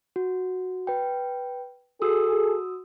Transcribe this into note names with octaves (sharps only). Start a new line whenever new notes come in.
F#4
B4 G5
F#4 G#4 A4 D#6 E6